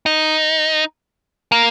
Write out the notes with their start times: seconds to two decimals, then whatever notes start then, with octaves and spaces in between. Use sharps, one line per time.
0.06 D#4
1.52 A#3